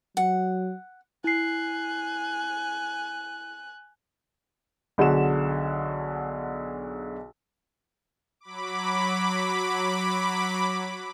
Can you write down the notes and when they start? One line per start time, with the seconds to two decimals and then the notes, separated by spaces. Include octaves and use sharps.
0.17 F#3 F#5
1.24 E4 G#5 F#6 C7
4.98 B1 D3 F#4 G#4 E7
8.40 F#3 B5 D6